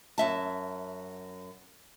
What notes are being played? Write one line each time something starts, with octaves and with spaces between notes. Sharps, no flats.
F#2 E5 A5